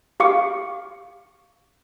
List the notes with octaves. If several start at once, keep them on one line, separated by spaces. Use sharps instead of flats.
G4 F5 C#6 D6 C#7